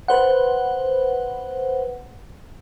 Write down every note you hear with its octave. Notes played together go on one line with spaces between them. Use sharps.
B4 C5 F#5